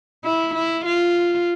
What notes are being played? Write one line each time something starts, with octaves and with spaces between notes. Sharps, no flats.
E4
E4
F4